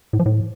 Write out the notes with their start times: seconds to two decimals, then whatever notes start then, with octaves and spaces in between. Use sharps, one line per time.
0.13 A2
0.19 F3
0.26 A2